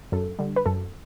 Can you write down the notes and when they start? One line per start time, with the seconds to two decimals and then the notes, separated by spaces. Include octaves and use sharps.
0.12 F#2 A4
0.39 D3 G3
0.56 B4
0.66 F#2 A4